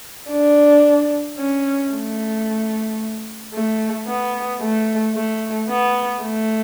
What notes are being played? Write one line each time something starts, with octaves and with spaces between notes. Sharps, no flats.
D4
C#4
A3
A3
B3
A3
A3
B3
A3